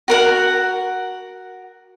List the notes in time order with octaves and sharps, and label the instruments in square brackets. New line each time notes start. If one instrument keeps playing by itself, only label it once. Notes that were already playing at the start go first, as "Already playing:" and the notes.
[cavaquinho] F#4 A#4 F#5